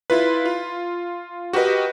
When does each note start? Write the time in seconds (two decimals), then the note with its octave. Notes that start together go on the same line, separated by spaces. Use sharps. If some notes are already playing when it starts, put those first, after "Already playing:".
0.10 E4 F4 B4
0.46 F4
1.53 F#4 G4 A#4 B4 D#5